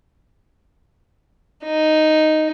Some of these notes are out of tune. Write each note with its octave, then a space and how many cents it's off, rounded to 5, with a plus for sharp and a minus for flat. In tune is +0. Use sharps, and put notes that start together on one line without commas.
D#4 +0